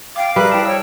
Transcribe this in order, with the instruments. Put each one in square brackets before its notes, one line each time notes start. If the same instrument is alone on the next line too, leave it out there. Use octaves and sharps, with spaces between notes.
[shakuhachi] F5 [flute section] G5 [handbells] D6
[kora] G3 [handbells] G#4 E5 [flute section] A#4 B4 F#6
[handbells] E4 C5 A5 [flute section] G5
[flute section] C#5 G5 [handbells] E6